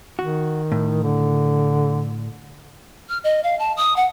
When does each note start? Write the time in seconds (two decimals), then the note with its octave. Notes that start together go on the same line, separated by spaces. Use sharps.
0.19 D#3 F#4
0.72 A2
1.03 D3
3.09 F6
3.24 D#5
3.44 F5
3.59 A5
3.77 D#6
3.96 F#5